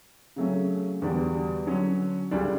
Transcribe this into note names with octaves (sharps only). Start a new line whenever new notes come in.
C#3 F#3 A3 C#4
E2 D3 G3 D4 F#4
D3 F#3 C#4
D2 C#3 G3 D4